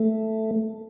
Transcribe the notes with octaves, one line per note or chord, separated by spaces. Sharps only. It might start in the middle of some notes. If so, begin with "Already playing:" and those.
Already playing: A3